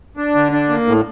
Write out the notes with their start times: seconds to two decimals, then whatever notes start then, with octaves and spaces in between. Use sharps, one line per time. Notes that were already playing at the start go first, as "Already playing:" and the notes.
0.17 D4
0.35 D3
0.52 D4
0.69 A#3
0.87 A2